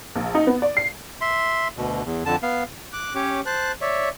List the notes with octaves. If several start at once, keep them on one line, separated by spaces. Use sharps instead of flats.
A#1
D#4
B3
D5
C7
E5 C6
D2 B2
E2
F2 D3 A5
B3 F5
D6 F#6
C#4 G4 C#5 D6
C5 A5 F#6
C#5 D5 E5